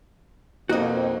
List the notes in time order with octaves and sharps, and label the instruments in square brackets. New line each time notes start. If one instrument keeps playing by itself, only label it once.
[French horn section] F2 B2 [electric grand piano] A#3 D#4 [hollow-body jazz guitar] F#4 D#5